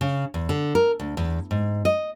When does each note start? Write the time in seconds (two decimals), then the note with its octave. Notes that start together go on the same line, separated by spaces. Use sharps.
0.01 C#3
0.34 E2
0.49 D3
0.75 A#4
1.00 D2
1.17 E2
1.51 G#2
1.85 D#5